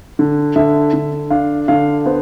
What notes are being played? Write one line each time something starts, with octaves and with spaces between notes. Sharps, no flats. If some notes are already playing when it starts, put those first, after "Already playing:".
D3
D3 E5
D3
D4 F5
D3 F5
B3 C5